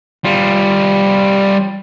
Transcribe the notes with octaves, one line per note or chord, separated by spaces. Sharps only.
G3 F4